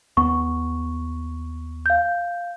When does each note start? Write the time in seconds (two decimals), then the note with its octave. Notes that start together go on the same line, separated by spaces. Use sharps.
0.17 D#2 B3 C#6
1.86 F5 G6